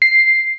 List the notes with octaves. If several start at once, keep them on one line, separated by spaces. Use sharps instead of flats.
C7